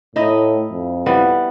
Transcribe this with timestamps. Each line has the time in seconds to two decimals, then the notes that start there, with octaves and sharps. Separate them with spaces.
0.16 A2 D#4 E4 D#5
0.71 F2
1.06 E3 G3 B3